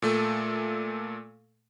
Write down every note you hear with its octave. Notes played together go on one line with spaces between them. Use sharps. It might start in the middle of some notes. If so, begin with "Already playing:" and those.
A#2 A3 A4